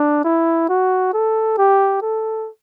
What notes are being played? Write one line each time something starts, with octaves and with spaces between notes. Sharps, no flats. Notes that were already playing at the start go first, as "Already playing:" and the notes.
Already playing: D4
E4
F#4
A4
G4
A4